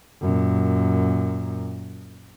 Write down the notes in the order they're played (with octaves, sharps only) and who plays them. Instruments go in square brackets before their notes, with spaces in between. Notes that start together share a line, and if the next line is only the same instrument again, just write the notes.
[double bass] F#2 A#2